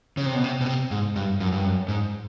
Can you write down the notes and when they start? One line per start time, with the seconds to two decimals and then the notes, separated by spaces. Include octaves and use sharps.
0.17 C#3
0.26 C3
0.35 B2
0.44 C3
0.61 B2
0.66 C3
0.91 G#2
1.16 G2
1.40 F#2
1.52 G2
1.64 F#2
1.88 G#2